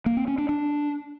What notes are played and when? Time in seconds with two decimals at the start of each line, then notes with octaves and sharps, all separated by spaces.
0.06 A#3
0.17 C4
0.28 C#4
0.38 D4
0.49 D4